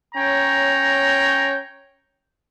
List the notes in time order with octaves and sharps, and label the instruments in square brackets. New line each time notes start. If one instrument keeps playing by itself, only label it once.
[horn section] C#4 C#5 G5 A#5